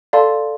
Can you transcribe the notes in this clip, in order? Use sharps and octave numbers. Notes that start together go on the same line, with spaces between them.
A4 D5 F5 A5 C6